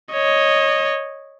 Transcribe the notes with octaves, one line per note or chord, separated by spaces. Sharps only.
C#5 D#5